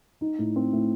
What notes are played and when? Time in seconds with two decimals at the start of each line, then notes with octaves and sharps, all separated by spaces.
0.21 D#4
0.38 A2
0.56 C4
0.73 A2